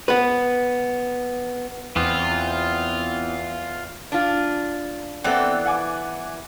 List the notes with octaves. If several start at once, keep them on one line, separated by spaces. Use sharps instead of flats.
B3 B4
E2 E3 B3 C4 F4
D4 F4
E3 B3 C4 A4 D5
F#5 G#5 D6